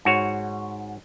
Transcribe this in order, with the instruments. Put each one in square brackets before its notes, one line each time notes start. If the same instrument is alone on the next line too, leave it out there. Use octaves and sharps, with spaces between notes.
[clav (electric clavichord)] G#2 F#4 C#5